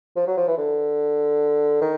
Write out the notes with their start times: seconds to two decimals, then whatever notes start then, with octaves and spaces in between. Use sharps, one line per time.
0.16 F3
0.27 F#3
0.37 F3
0.48 E3
0.58 D3
1.81 D#3